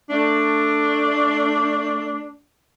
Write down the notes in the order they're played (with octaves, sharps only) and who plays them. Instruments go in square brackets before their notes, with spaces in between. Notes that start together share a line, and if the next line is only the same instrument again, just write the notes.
[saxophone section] A3 D4